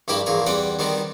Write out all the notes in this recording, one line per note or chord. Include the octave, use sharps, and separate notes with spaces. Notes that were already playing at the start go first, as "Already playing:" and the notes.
A#1 G2 E4 G4 A#4 B5
A#1 E2 A#2 G#4 A#5
E2 G3 C4 F#5 G5 D6
D#3 G3 B3 C4 D#4